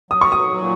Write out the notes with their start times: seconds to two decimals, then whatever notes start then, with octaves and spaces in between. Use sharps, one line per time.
0.11 F#3 D#6
0.21 C#6
0.32 D#6
0.57 A#2